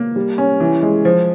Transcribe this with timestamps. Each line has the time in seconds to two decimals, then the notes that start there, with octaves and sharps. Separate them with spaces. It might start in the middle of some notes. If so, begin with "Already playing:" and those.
Already playing: A#3
0.16 G3
0.38 C#4
0.60 E3
0.83 G#3
1.05 F3